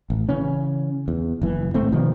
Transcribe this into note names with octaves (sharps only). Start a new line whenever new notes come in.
A1
C#3 E3 C#4
E2
F#1 E3
A1 G#2 A3 C4
G2 B2 D#3 F3